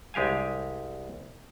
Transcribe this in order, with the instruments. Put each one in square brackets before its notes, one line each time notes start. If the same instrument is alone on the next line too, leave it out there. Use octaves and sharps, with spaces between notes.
[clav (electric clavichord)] C2 G#3 G4 F5 G#5